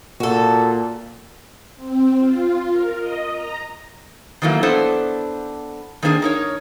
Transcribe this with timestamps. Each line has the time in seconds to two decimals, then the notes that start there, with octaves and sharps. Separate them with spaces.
0.20 A#2 F#4 A4
1.76 C4
2.19 F4
2.69 A#4
2.99 D#5
3.32 A#5
4.42 D#3 E3 F#3 A3 A#3
4.63 B3 D4 E4 A4 C5
6.03 D#3 A#3 C4 D4 G#4 C5
6.22 D#4 A#4 C#5